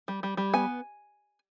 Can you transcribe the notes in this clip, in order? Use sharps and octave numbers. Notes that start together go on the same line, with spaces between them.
G3
G3
G3
B3 G#5